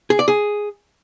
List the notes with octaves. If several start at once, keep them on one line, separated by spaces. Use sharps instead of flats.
G#4
D5
G#4